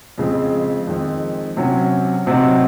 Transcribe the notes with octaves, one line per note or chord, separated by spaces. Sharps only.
F2 C#3 G#3 C4
F2 D#3 G#3 C4
C3 F#3 C#4
C3 F#3 C4 D#4